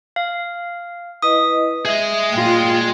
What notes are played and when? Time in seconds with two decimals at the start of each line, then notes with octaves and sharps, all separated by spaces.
0.16 F5
1.22 E4 B4 D#5 D#6
1.85 G#4 D#5 E5
2.33 A#2 F4 G5